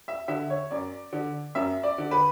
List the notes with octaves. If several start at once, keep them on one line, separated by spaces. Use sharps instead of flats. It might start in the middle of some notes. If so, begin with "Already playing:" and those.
E5
D3 E5
C#5
F#2 D5
D3
F#2 E5
D5
D3
B4